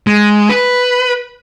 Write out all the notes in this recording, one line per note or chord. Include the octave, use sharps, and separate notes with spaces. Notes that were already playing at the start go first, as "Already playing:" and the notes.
G#3
B4